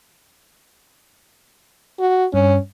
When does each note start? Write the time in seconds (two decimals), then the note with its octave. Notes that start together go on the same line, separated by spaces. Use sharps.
1.99 F#4
2.34 G2 C#4